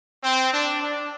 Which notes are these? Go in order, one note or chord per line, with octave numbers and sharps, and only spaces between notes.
C4
D4
D4